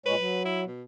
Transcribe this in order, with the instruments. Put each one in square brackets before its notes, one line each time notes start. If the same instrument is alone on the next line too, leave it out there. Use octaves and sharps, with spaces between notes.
[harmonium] A#2 G#3 C#5 [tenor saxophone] B4
[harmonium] F#3
[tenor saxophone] E4
B2